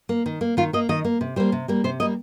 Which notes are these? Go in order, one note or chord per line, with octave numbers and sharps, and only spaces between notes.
A#3
D#3
A#3
D#3 F4
A#3 D#5
D#3 D#5
A#3
C3
G3 A#3 C5
C3
G3 A#3
C3 C5
G3 A#3 D#5